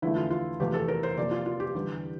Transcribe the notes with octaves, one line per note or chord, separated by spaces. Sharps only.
E2 D3 F3 A3 E4
F4
F4
E2 C3 F3 A3 G4
A4
A#4
C5
C3 F3 A#3 D5
F4
F4
G4
E2 D3 G3